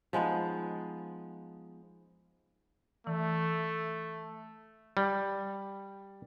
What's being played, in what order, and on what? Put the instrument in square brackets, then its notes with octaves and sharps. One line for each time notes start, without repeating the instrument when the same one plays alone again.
[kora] F3 G#3 B3 D#4
[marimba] E3 [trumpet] A3
[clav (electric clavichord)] G3